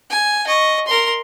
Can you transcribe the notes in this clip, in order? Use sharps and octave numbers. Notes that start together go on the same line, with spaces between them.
G#5
D#5 C#6
A#4 C6